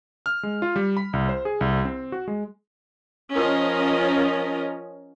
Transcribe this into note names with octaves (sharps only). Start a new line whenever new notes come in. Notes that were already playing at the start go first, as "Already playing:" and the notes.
F6
G#3
F4
G3
B5
C2
C5
G#4
C2
C4
F#4
G#3
F3 C#4 A#4 D#5